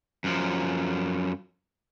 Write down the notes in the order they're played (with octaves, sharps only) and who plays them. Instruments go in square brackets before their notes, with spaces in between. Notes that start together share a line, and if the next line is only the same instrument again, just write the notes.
[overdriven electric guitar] F#2 F3